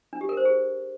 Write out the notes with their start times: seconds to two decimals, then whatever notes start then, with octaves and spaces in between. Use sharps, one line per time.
0.13 D4
0.21 G4
0.29 A#4
0.37 C5
0.45 G#4